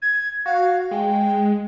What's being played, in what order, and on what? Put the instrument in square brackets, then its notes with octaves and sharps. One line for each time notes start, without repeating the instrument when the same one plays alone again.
[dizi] G#6
[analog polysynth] F#4 [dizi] F5
[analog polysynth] G#3 [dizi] G5